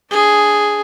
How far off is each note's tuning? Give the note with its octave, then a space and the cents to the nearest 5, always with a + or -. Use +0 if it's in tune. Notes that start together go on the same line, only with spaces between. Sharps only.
D4 -10 G#4 +0